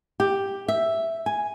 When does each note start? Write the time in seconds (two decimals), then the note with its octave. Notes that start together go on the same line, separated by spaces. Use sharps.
0.20 G4
0.68 E5
1.26 G#5